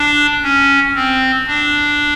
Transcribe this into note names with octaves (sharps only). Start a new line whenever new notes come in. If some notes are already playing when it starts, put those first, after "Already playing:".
Already playing: D4
C#4
C4
D4